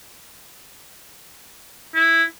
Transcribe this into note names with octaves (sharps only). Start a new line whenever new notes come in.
E4